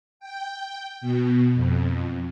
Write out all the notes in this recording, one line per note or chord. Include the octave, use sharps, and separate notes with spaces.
G5
B2
F2